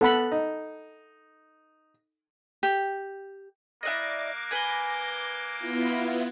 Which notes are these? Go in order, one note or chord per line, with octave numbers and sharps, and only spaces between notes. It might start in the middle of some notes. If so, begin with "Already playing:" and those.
B3 A4 F#5 B5
D#4
G4
A#3 E4 D5 D#5 D6 F#6 A#6
B4 G#5 G#6 G7
B3 E4 F4